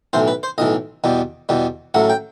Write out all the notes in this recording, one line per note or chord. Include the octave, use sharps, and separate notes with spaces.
B1 A2 E3 C5
B4
C5
B1 A2 E3 D#5
E2 B2 G3
E2 B2 G3
A1 A2 F#3 A3 F#5
G5